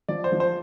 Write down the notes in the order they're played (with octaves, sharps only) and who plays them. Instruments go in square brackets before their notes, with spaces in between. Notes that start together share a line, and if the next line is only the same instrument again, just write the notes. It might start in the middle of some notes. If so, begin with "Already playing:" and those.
[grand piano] F3 D5
C5
F3
C5